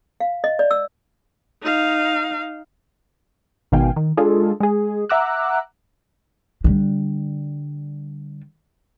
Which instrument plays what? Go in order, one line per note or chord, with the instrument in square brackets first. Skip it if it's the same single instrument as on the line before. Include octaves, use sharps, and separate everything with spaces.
[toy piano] F5
D#5
D5
E6
[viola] D#4 F5
[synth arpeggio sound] G#1 B2 D#3 F5 G5 G#5
D#3
G#3 D4 F4 G#4 A4
G#3 G#4
E5 F#5 A#5 D6 E6 F#6
[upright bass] D3 G3